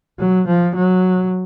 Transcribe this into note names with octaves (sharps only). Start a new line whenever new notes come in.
F#3
F3
F#3